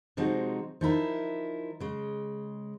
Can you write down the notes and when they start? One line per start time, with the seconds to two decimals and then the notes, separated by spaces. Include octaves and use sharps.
0.17 C3 F3 G#3 D#4 F#4
0.81 F3 D#4 E4 A#4
1.80 C#3 G#3